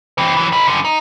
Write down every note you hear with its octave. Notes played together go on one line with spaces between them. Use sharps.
E3 C4
E3 F#3
D#4 B4
F#2 D3
D#4